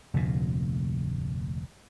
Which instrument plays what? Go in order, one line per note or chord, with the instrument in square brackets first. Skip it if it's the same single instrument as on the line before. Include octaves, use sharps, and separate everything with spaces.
[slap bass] F1 D2 A#2